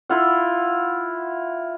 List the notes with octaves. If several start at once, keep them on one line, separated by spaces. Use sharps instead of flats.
E4 F4 F#5